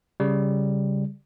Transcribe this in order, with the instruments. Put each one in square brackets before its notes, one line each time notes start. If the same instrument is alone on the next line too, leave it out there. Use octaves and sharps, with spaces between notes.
[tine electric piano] C#3 G3